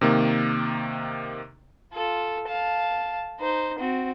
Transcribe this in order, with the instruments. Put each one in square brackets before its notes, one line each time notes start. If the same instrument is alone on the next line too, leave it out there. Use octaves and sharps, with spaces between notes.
[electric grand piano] C3 D#3 A#3
[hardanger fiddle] F4 A4
F5 A5
D#4 C5
C4 F#4